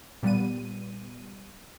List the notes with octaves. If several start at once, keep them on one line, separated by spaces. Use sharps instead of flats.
A#2 G3 B3 D#7